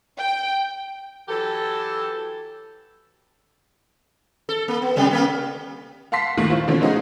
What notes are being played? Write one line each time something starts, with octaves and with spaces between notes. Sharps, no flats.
G5
E3 F#3 G4 A4
A4
A#3
B3
C3 G3 A3
A3 A#3 C#4
F5 F#5 A5 C6 B6 C7
D#2 A#2 D#3 A3 A#3
E4 F4 C5
B2 D3 F3 A#3 C4 C#4
A3 C#4 D#4 F#4 G#4